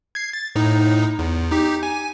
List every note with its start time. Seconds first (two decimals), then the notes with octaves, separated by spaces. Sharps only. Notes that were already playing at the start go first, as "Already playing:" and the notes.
0.15 G#6 C7
0.33 A6
0.55 A2 D#4
1.19 E2
1.51 D#4 G4
1.83 G#5